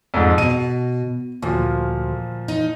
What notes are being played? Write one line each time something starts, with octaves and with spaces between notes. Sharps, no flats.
F2 G#2
B2 D#7
D2 A#2 F3
D#4